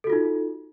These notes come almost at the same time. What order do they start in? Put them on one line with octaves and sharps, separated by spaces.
A4 F#4 F4 D#4